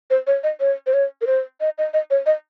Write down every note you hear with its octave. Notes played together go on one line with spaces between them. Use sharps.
C5
C#5
D#5
C#5
C5
C#5
A#4
C5
D#5
D#5
D#5
C#5
D#5